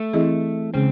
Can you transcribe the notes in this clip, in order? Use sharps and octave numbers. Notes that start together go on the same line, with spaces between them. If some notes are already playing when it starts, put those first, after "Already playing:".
Already playing: A3
E3 C4 E4 G#4 D#5
C#3 G#3 C4 C#4 G#4